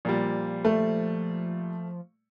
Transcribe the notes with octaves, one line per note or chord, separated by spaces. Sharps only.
A#2 F3 G3
A3